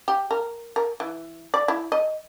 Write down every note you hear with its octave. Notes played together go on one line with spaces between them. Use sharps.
G4
A#4
A#4
E3
D5
E4
D#5